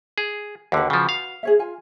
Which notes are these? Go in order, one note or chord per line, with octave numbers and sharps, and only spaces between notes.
G#4
D#2 D3 F#4 B4
C#3 F3
F5
G#4 C#5 E5
F4 G#5